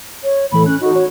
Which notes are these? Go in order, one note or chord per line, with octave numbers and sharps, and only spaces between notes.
C#5
A2 E3 A4 B5
C#4 F#6
D#4 F#4 A4
C#5